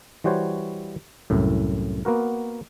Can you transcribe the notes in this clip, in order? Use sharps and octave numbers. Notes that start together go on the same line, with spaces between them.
E3 G3 F#4 C5 C#5
C2 F#2 A2
A#3 B3 F#4 A#4